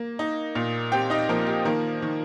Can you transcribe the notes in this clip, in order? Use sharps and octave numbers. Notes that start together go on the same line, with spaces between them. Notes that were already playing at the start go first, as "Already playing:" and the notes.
Already playing: A#3
D#4
A#2
C4 G4 G5
D#4 D#5
F3 A#3 A#4
G4
D#3 A#3 A#4
D#3